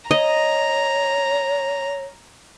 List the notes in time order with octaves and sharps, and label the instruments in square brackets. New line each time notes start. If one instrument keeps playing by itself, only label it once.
[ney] C#5 [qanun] D#5 [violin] A#5